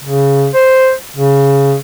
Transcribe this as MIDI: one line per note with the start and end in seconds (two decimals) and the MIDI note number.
0.04 0.48 49
0.54 0.92 72
1.17 1.76 49